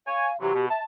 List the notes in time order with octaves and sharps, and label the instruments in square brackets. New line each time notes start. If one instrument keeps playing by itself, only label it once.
[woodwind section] C#5 G#5 [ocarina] F5
[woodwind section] C3 E3 F#3 [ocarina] G4
[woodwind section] B2
[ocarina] E5 [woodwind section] A5